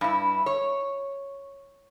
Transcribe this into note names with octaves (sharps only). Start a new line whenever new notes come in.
G2 E4
C#5